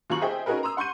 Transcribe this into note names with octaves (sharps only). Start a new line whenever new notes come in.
D#2 F#3 F4 A#5 C#6 F#7
G#4 C5 D#5 E5 G5
C#4 D#4 F#4 G#4 A#4 B4
A#5 C6 D#6 E6
F#5 C6 C#6 G6 D#7